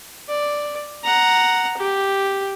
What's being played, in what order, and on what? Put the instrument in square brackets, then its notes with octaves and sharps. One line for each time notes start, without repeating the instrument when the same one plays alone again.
[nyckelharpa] D5
F#5 A#5
G4